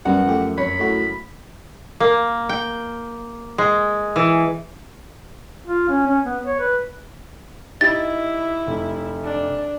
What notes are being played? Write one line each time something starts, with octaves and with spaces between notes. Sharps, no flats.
F#2 G3 B3 F#4 F#5
F3 A3 G4
F2 C#5 B5
A3 E4 F#4
A#3
G5
G#3
E3
F4
C#4
C#4
B3
C#5
B4
D#4 E4 G4 A6
F1
D4